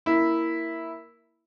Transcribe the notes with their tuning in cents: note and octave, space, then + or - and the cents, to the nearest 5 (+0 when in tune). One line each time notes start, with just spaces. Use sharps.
A#3 +0 E4 +0